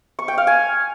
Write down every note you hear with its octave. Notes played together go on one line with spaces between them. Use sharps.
C#6
G5
F5
G#5